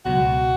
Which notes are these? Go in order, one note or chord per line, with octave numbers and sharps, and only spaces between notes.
C#2 B2 F#3 F#4